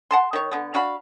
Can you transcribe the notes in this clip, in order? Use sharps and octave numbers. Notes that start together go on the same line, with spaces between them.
F#5 A5 C6
D#3 C#5
D3 B3
D4 F#4 F5 B5